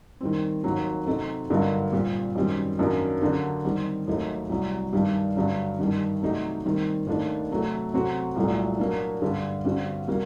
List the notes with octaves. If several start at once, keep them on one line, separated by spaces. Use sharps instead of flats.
D#3 G3 C4
D#2 D#3 F#3 C4
C3 F#3 C4 D#4 A4
G2 D3 F#3 A#3 D#4
A#2 G3 C4
F#2 D#3 G3 C4 G4
F#2 D#3 F#3 A#3 D4
D3 F#3 A#3 D4 G4
D#3 G3 C4
D#2 D#3 F#3 A3 D#4
C2 C3 F#3
G2 D#3 G3 D4 G4
G2 D3 F#3
G2 D#3 G3 D4
C3 F#3 A3 D#4 G4
D#3 G3 C4
D#2 D#3 A3 D4
C3 F#3 A3
C3 F#3 C4 F#4 A4
C2 A#2 F#3 A3
F#3 A#3 D4
G2 D3 G3
G2 D3 G3 C4 F#4
C3 G3 A#3 F#4